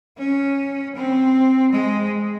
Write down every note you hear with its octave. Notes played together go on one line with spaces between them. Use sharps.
C#4
C4
G#3